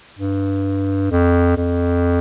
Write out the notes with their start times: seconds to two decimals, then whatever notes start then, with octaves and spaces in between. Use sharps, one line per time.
0.19 G2
1.11 F2
1.57 F2